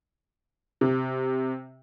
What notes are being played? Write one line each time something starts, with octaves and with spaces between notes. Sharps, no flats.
C3